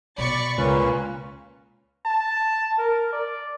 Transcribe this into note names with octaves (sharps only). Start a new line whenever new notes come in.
B2 B3 D5 B5 C#6 A6
C#2 A#2 C#4 B4
A5
A#4
D5